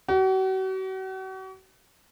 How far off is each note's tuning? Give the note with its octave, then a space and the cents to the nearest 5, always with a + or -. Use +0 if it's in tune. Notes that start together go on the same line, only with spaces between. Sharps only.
F#4 +40